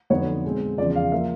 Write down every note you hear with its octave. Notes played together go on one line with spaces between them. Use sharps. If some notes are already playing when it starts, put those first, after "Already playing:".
F2 D3 F#3 B3 D#4 C#5
B2 G#3 C4
E2 C#3 F3 D5
F5
F3 A#3 E5